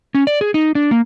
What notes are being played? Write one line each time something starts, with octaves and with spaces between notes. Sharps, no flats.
C#4
D5
G#4
D#4
D4
A#3